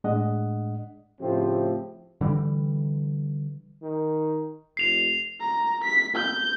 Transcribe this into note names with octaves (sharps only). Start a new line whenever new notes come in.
A2 G#3 D4 D#5 F#5
A2 C#3 F3 A3 C4 G4
D3 E3 G3
D#3
F1 C7 F7
A#5
B6
G6